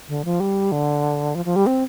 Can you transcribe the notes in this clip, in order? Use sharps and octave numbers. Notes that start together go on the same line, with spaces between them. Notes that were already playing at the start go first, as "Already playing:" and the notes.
D3
F3
G3
D3
F3
F3
G3
C4